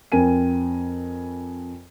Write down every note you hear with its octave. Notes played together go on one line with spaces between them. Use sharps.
F2 C4 A#4 G#5 D#7